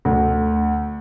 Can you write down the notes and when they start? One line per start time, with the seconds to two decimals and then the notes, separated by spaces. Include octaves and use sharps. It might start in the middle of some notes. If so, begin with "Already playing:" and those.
0.05 D2